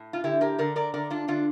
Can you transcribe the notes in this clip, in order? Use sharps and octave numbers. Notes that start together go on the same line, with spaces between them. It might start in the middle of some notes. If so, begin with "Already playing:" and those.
Already playing: A2
F4
D3 E4 G4
G4 A#4
D3 A#4 D5
A#4 D5
D3 A#4 D5
D4 F4
D3 D4 F4